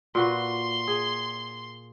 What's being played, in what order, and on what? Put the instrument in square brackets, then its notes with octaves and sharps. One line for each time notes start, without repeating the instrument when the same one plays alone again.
[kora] A#2 F#4 B4 [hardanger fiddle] C6
[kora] G#4